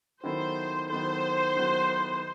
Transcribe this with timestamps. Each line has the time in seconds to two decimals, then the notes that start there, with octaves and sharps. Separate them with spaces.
0.24 D#3 F#3 B3 E4 A4 C5
0.89 D#3 F#3 B3 E4 A4 C5
1.56 D#3 F#3 B3 E4 A4